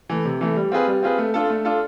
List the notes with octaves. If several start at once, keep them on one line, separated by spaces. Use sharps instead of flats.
E3 A3
C3
E3 A3
G3
C4 F4 G#4 B4
G3
C4 F4 G#4 B4
A3
D4 F4 A4
A3
D4 F4 A4